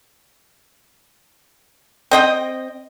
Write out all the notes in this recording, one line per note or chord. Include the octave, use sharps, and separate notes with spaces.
C4 D#5 G5